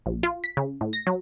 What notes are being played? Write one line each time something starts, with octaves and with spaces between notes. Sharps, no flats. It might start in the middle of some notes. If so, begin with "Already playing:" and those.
A#1
F4
B6
C#3
A2
A#6
F#3